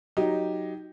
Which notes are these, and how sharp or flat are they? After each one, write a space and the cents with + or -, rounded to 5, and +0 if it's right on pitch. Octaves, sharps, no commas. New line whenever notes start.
F#3 +0 D#4 +0 G4 +0